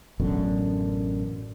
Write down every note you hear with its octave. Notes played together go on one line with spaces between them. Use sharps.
A1 F#2 B2 D3